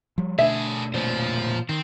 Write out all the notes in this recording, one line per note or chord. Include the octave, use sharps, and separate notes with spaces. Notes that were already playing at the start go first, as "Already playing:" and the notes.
F3 G3
B2 D3 A3 D4 G#4 E5
A#2 F3 C5 C#5
D#3 C4